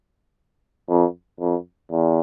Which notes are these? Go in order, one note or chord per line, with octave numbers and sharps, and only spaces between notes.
F2
F2
E2